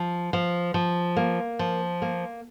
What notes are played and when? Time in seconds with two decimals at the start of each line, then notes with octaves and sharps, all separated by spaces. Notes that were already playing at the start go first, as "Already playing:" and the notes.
Already playing: F3
0.33 F3
0.74 F3
1.16 A#3
1.59 F3
2.02 A#3